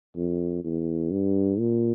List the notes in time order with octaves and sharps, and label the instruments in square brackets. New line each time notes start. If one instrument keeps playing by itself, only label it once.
[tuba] F2
E2
G2
A#2